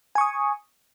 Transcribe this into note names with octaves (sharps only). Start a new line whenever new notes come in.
G#5 C#6 D#6